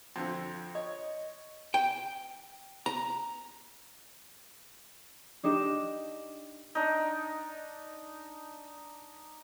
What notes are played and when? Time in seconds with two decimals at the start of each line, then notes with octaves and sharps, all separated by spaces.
0.16 F2 D3 F3
0.75 C#5 D#5
1.74 G5
2.86 A#5
5.43 D4 D#4 G4 E7
6.75 D4 D#4